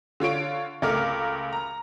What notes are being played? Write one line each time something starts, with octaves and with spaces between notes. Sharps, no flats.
D3 F4 C#5 D7
C#2 A3 A#4 D6 F6
A#5